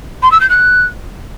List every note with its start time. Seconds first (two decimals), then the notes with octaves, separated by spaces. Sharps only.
0.23 C6
0.32 E6
0.41 G6
0.50 F#6